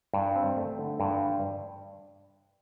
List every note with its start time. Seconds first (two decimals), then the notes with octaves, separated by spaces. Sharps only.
0.14 G2
0.36 C4
0.57 A3
0.79 D3
1.00 G2